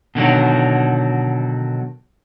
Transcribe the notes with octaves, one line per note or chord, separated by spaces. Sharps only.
B2 D3 D#3 F#3